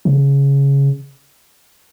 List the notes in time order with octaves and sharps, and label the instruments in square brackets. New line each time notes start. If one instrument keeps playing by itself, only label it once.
[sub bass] C#3